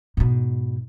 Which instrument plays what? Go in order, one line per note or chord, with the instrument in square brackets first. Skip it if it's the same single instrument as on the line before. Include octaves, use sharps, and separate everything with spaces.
[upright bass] G#2 B2